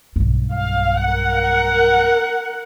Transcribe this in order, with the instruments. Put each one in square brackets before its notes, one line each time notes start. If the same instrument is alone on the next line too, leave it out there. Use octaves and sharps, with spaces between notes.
[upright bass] B1 G2
[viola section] F5
A#4 F#5